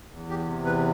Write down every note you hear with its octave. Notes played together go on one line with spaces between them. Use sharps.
E2
G4
C3
B4